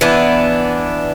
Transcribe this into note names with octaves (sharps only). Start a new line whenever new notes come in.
E3 B3 D4